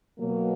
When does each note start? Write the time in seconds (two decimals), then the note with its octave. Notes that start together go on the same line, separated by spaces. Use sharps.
0.19 B2 F#3 A#3